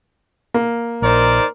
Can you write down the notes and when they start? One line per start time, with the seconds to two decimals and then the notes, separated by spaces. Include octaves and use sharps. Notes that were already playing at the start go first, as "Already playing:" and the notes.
0.54 A#3
1.02 A#1 D#4 A#4 C5 D5